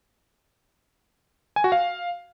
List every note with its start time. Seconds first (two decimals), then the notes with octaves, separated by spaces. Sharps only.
1.56 G#5
1.64 F#4
1.72 F5